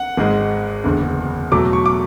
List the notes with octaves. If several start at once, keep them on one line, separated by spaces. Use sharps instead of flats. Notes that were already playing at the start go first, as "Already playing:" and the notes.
Already playing: F#5
G#1 G#2 G#3
F#1 E2 D3
E2 B2 F#3 A3 D6
C#6
D6